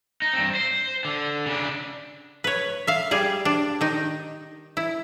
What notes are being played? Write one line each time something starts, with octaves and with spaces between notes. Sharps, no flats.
D#4
G2 C4
C5
D3
C#3 D4
B4 C#5
E5 F5
G3 G#4
D4
D#3 D#4
E4